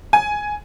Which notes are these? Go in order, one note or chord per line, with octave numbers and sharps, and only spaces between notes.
G#5